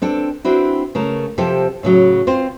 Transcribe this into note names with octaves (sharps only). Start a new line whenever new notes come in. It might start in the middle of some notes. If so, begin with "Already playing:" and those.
C4 D4 A4
C4 D4 E4 F#4
C#3 A3 A#4
C3 F3 C4 G4 A4
A2 C#3 F#3
C4 F4 C5